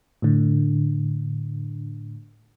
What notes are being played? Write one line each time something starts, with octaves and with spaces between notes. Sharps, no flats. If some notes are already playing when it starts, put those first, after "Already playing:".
A2 D3